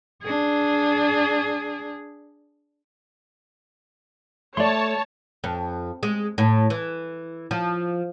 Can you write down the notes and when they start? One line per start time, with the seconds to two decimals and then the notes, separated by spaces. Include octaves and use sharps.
0.22 D4 G#4
4.57 A3 C#5 D5 A5 C6
5.44 F2
6.03 G#3
6.38 A2
6.70 E3
7.51 F3